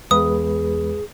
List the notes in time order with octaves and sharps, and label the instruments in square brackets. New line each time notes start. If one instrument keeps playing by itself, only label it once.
[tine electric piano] E2 [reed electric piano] G#3 B4 [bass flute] G#4 [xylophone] D#6